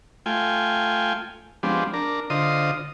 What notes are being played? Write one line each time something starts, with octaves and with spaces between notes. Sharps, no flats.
A3 F4 G5 G#5
F3 G#3 B3 C4 D4 G4
D4 A#4
D3 F4 C5 D#5 D#6